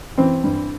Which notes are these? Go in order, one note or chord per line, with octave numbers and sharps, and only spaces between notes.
E3 C4
G2